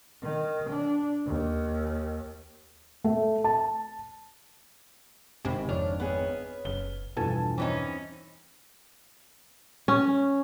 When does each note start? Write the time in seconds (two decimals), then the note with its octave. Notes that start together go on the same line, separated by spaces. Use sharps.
0.22 D#3
0.70 D4
1.26 D#2
3.04 A3
3.44 A5
5.45 G#1 C3 G#5 B5
5.69 F2 D4 C#5 F6
6.00 B3 G#4
6.65 F#1 G7
7.17 E2 G2 B2 F3 A4 G#5 A5
7.58 E3 C4 C#4 D#4
9.88 C#4